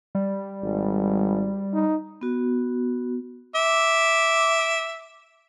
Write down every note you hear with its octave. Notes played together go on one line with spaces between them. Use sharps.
G3
G#1
D#4
B3 F#4
E5 D6